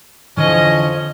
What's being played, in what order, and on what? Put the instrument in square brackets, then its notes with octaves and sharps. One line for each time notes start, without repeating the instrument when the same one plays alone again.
[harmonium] F2 F3 [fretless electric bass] D3 E3 [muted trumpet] C#4 [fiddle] D#5